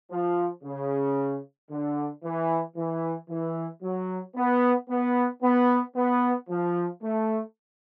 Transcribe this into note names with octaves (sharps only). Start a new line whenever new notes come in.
F3
C#3
D3
E3
E3
E3
F#3
B3
B3
B3
B3
F3
A3